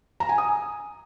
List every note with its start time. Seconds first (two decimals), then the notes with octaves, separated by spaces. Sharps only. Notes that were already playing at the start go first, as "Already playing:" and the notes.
0.20 A#5
0.29 G#5
0.38 D#6